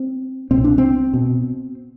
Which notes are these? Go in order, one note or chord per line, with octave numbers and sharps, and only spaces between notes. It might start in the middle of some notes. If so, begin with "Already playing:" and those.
Already playing: C4
C2 B2 C4
D4
C4
B2